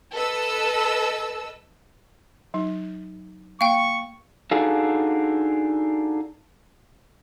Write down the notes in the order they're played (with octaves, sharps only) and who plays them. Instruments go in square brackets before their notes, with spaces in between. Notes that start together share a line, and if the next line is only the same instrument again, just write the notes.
[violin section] A4 B4 D#5 E6
[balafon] F#3 D#4
[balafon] A#3 [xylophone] F5 G5 [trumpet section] C#6
[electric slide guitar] D4 D#4 F#4 G#4 A4 F5